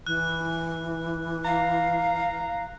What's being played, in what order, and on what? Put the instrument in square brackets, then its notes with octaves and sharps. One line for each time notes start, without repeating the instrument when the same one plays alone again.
[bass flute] E3 [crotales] F#6
[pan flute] F5 [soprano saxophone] A#5